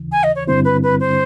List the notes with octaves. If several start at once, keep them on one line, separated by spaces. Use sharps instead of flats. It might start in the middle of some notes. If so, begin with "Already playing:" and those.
Already playing: D#2 C#3 E3
G#5
D#5
C#5
G2 D3 G3 C4 E4 C5
B4
B4
C5